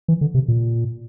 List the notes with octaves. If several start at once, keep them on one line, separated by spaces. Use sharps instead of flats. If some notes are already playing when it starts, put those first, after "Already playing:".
E3
D3
C3
A#2